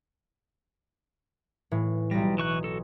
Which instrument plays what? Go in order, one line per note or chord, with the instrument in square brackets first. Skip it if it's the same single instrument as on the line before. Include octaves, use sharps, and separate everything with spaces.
[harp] A2 E3
[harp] B1 A#6 [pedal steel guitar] G3
[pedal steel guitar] E3 C#6 F#6
F#4 A4